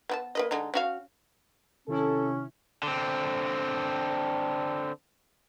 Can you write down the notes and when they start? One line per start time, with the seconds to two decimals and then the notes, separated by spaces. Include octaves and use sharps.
0.09 B3 B4 A5
0.35 A#3 B4 D#5
0.51 D3 G#3 D#4
0.74 C#4 F#4 F5
1.88 C3 D#3 C#4 E4 A4
2.83 D3 C4